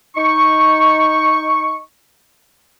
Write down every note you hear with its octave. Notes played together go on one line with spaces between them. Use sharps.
D#4 C#6